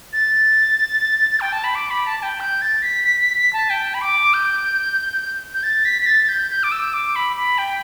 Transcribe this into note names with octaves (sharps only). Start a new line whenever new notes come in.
A6
G5
A5
B5
D6
B5
A5
A5
G5
G6
A6
B6
B6
B6
B6
A5
G5
B5
D6
G6
G6
A6
B6
B6
A6
A6
G6
G6
D6
E6
D6
B5
B5
G5